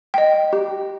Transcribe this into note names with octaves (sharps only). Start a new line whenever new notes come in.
D#5 G5
G4